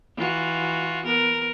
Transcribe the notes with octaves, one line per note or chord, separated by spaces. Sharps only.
E3 F4 F#4
B3 A#4